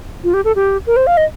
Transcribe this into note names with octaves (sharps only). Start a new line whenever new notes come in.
F4
G4
A4
G4
A#4
C5
F5
D#5